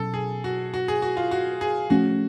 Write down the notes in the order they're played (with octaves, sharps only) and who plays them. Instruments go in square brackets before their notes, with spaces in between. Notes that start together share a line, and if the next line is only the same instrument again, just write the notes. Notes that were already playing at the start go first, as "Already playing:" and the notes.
Already playing: [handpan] B2 F#3 C#4 [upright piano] A4
[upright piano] G#4
F#4
F#4
G#4
F#4
F4
F#4
G#4
[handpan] F3 A3 C#4 [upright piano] F#4